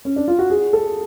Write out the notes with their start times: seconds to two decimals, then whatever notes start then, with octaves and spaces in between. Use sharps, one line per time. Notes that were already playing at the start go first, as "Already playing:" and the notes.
0.05 C#4
0.16 D4
0.28 F4
0.39 F#4
0.50 G#4
0.73 A4